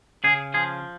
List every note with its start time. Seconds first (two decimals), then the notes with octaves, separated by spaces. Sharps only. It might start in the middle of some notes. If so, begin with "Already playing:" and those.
0.24 C#3 G#4
0.54 F3 G#4